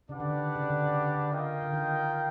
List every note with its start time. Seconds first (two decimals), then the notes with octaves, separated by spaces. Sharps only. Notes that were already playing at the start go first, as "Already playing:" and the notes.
0.09 C#3 D4 G4 B4 D5 F#5
0.20 D3
0.30 D#3
0.55 C#3
0.70 D3
0.86 C#3
1.01 D3
1.16 D3
1.32 F4 A#4 D#5 G5
1.62 D3
1.73 D#3